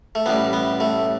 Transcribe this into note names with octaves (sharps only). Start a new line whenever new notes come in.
A3
A1 A2 G3 B3
B3
A3